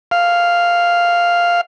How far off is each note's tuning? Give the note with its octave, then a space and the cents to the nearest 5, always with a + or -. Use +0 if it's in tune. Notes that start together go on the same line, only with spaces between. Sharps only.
F5 -5